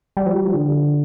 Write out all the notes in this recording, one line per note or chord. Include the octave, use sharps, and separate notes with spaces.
G3
F3
G3
F3
D3